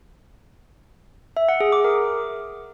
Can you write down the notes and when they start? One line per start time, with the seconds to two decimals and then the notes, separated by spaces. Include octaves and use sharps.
1.37 E5
1.49 F#5
1.60 G#4
1.72 D6
1.84 A#4